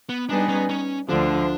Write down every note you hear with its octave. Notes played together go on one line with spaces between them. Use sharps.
B3
G3 B3 D4 D#4 G#4 B4
C#4
C#4
D2 D3 F3 D4